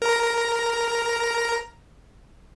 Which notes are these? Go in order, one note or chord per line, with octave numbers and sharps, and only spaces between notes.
A#4 A#5